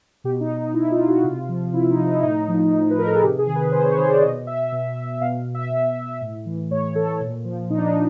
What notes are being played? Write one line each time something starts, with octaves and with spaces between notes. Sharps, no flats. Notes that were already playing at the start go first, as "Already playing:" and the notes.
B2 G4
D#4
D#4
B2 E4
F4
F#4
C3 F4
F3
C3 E4
D#4
F3
D#4
E4
A2 D#4
F3
A2
B4
F3 A#4
A4
G#4
C3 G4
G#4
D#3
B4
C3 C5
C#5
D#3 C5
D5
B2 D#5
E5
B2
B2 F5
E5
B2
A2
E3
A2 C#5
E3 A4
A#2
F3
A#2 D#4
D4
D#4